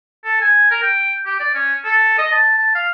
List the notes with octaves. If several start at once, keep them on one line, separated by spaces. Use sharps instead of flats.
A4
G#5
A#4
G5
G4
D5
C#4
A4
D#5
A5
A5
F5